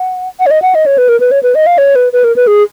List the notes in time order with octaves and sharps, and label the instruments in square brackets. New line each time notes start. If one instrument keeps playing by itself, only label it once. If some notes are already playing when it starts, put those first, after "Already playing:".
Already playing: [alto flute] F#5
F#5
C#5
D#5
F#5
D#5
C#5
B4
A#4
B4
C#5
B4
D#5
F5
C#5
B4
B4
A#4
B4
G#4